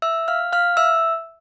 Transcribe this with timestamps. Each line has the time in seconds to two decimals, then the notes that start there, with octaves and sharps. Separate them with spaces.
0.02 E5 E6
0.28 F5 F6
0.53 F5 F6
0.77 E5 E6